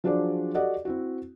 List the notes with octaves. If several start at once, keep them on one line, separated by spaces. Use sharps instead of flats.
F3 F#3 D4 G#4 C5 D5
F#4 G4 A4 D5 D#5 F#5
C4 E4 F#4